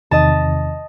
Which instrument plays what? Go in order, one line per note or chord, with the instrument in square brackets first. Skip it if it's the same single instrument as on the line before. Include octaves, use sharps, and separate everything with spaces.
[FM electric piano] E2 C3 D#3 [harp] D#5 A5